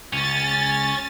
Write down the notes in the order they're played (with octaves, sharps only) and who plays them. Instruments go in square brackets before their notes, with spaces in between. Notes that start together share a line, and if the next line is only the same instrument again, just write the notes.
[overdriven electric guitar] C#2 [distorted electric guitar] C#4 [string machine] A6